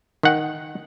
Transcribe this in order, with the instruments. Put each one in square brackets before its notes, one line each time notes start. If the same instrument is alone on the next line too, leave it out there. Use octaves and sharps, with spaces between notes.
[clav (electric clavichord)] D#3 F#5 G5